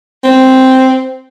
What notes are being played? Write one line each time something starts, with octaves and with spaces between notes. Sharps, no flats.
C4